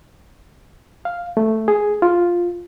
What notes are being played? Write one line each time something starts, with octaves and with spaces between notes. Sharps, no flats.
F5
A3
G#4
F4